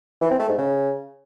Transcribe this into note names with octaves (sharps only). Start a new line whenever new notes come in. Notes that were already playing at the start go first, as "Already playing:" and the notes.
E3
C4
A3
G#2
C#3